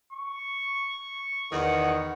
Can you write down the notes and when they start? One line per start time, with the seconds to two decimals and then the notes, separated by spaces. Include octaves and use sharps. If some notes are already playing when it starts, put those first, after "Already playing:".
0.13 C#6
1.52 E2 D#3 F#5